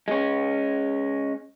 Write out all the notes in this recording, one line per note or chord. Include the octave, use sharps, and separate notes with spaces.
G#3 C#4